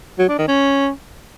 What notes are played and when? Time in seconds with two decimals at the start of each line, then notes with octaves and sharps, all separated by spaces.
0.19 F#3
0.28 D4
0.38 D#3
0.48 C#4